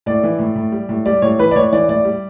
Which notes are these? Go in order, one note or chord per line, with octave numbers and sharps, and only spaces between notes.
A2 D5
E3
A2
A2
G3
A2
G3 D5
A2 C#5
E3 B4
D5
A2 C#5
E3 D5
A2 D5
G3